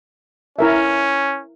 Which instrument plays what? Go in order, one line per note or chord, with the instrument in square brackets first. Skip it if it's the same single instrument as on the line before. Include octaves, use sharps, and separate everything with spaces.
[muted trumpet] C#4 [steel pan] E4 A#4 E5